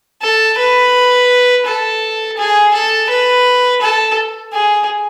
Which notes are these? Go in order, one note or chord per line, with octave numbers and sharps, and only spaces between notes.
A4
B4
A4
G#4
A4
B4
A4
G#4